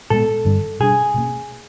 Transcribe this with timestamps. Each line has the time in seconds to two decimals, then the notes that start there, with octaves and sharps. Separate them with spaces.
0.10 A#2 F3 G#3 B3 A4
0.45 G2 D3 G3 C4
0.80 B2 G3 A#3 D4 G#4
1.14 B2 G3 A#3 C#4